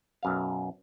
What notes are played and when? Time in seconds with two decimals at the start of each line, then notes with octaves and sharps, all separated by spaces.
0.23 B1 F#2 F5